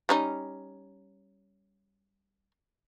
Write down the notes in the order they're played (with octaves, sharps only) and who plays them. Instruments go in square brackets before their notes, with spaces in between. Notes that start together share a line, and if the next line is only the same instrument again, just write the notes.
[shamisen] G3 C#4 D#4